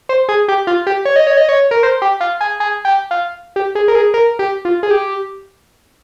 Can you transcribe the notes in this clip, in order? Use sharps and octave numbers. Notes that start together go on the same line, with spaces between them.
C5
G#4
G4
F4
G4
C#5
D#5
C#5
D#5
C#5
A#4
C5
G4
F4
G#4
G#4
G4
F4
G4
G#4
A#4
G#4
A#4
G4
F4
G#4
G4